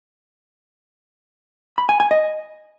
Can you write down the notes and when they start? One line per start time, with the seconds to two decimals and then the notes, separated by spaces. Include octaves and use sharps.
1.78 B5
1.89 G#5
2.00 G#5
2.11 D#5